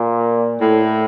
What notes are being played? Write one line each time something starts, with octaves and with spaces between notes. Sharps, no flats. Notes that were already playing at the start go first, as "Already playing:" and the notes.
Already playing: A#2
A2